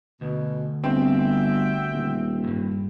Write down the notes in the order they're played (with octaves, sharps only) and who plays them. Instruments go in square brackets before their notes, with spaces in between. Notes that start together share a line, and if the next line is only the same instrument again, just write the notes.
[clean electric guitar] D2 [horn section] B2
[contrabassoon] G1 [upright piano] C4 [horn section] F#4 E5 G5
[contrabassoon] D#1
[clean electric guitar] D2 G2